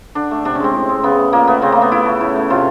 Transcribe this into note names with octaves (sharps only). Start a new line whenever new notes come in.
D3 D4
A3
C3 D4
C#4
G#3 C4
A2
G#3
C#3 B3
A3
A#2 A#3
A3 B3
C#3 C4
A3 A#3
B3
C#3 E4
A3
A2
A3
C3 F4